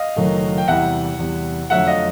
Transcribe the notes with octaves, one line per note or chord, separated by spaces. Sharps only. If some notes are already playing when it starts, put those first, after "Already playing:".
Already playing: D#5 F5
F#1 F#2 D#3 F#3 A3
G5
E2 C3 E3 G3 E5 F#5
E2 C3 E3 G3
F2 D3 F#3 A3 E5 F#5
D#5 F5